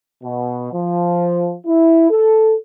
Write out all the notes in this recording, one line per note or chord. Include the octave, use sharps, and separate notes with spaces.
B2
F3
E4
A4